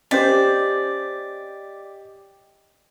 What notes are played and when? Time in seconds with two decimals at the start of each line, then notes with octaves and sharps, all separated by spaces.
0.11 C#4 G4 C5 D5 D#5 B6